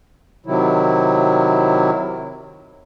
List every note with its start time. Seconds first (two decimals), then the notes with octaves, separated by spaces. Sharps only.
0.46 C3 D#3 F#3 E4